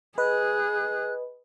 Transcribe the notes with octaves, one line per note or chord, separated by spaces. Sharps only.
G#4 B4 D#5 F#6